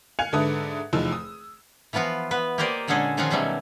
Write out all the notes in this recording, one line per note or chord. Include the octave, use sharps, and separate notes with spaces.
F5 G#5 F#6 G#6 C#7 F7
G#2 D3 A4 B4 E5 D#6
F1 E2 F3 D#4 E6
D#6
E3 F3 B3 F4 F#4
B3 B4
A#3 G4 A#4 C5 D5 D#5
A#2 D3 G#3 C#4 G#4 A4
D#3 F3 C#4 F4 F#4 G#4
B2 D#3 F#3 G3 A3 C#4